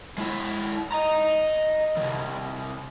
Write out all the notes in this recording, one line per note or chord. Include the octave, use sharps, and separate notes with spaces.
G#3 E4
D#5 A#5
C2 D#3